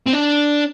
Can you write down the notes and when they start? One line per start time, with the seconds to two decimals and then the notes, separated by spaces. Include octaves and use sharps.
0.07 C4
0.13 D4